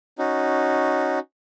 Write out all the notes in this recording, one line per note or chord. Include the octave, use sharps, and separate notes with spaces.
C#4 D#4 F#4